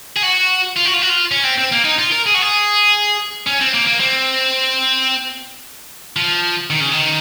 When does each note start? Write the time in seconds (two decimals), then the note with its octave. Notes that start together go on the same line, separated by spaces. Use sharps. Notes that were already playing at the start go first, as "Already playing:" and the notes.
0.16 G#4
0.23 F#4
0.77 F4
0.86 F#4
0.94 F4
1.02 F#4
1.09 F4
1.32 C#4
1.44 C4
1.58 C4
1.72 A#3
1.84 D#4
1.98 F4
2.12 A#4
2.26 G#4
2.34 F#4
2.41 G#4
3.47 C#4
3.61 C4
3.74 A#3
3.87 A#3
4.00 C4
6.17 F3
6.70 D#3
6.80 C#3
6.92 D#3